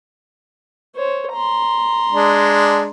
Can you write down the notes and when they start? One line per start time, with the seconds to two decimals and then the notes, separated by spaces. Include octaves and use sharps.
0.96 C5 C#5
1.33 A#5 C6
2.12 G#3 D4